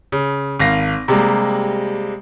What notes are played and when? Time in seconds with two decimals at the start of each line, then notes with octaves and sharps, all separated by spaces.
0.12 C#3
0.59 G#1 F5 A#6
1.08 C3 G3 G#3 A#3